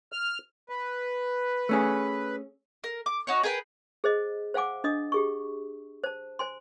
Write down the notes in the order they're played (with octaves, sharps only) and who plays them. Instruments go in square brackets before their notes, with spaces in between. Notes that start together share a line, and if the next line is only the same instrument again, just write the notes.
[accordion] F6
B4
[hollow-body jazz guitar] A3 C#4 G#4
[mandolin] A#4
D6
D#4 F#4 C#5
G#4 A#4 B4 G5
[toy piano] G#4 C5 D#5
C5 F5 F#5 G#5 D6
D4 D#5 D#6
G4 G#4 C#6
C5 A5
C5 G#5 C6